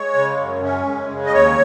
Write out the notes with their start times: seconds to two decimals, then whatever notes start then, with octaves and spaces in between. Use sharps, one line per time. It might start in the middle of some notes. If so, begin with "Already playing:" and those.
Already playing: G#3 C#5
0.15 C#3
0.39 F#2
0.62 C#4
0.86 G#3
1.09 C#3
1.26 D#5
1.32 D#2 C#5